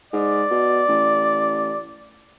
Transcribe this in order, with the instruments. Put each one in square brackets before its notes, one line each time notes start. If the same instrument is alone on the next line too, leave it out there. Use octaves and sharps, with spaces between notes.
[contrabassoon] G#2 [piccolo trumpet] D5
[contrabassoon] B2
A1